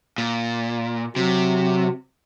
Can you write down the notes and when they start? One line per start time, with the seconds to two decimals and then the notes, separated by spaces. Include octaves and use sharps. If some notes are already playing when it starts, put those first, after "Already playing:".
0.18 A#2
1.16 C3 F#3